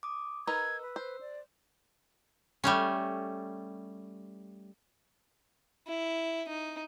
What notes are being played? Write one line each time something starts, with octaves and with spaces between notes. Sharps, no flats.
D6 D#6
D#4 A#4 B4 E6 G#6
B4
C5
D5
G3 A3 C#4
E4
D#4